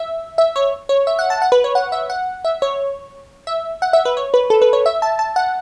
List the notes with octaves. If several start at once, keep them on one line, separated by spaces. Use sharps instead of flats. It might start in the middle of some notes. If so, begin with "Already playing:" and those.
Already playing: E5
E5
C#5
C#5
E5
F#5
A5
F#5
B4
C#5
F#5
E5
F#5
E5
C#5
E5
F#5
E5
B4
C#5
B4
A4
B4
C#5
E5
A5
A5
F#5